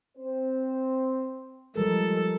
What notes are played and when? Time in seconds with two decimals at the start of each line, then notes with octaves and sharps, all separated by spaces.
0.18 C4 C5
1.76 F3 G3 G#3 A4 A#4